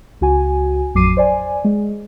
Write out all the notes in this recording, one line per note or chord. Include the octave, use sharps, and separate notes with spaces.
C#2 F#4 G#5
A1 F2 F#3 D6 C7 D#7
C5 D5 G#5
G#3